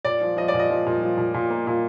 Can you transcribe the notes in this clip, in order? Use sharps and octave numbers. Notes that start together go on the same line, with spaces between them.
A#2 D5
F3
F3 D#5
D5
A#2
D#5
F3
A#2
F3
A#2
A#2
A#3
A#2